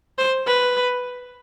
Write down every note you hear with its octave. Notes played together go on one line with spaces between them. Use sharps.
C5
B4